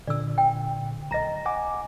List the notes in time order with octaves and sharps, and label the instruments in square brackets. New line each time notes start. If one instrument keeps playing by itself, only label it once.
[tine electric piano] A#2 D3 [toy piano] D5 E6
[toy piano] G5
[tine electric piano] B1 A#6 [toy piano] D#5 A#5
[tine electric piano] F#5 G#5 D6